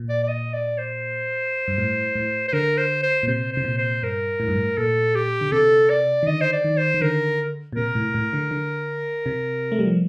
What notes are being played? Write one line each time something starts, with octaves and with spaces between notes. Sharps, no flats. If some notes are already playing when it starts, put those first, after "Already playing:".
Already playing: A#2
D5
D5
D#5
D5
C5
G2
A2
A2
C5
D3 A#4
C5
C5
A#2
C3 C5
C3 C5
A#2
C5
G2 A#4
A2
G2
A2
A#2 A4
G4
D3
C3 A4
D5
D#3
D3 D#5
C5
D5
D#3
C5
D#3
D3 A#4
A#2
C3 A#4
A2
A2
D3
D3
C3
A3
G3
F3